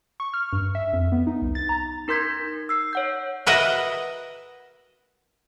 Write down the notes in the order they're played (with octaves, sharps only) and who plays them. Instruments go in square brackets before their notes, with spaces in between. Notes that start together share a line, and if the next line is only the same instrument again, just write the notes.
[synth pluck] C#6
F6
G2
E5
F2
B3
D#4
C2
A6
A#5
[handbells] D#4 A#4 C6 G6 G#6 B6
E6 C7
C#5 F#5 G6
[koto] F#4 A#4 B4 D#5 E5 F#5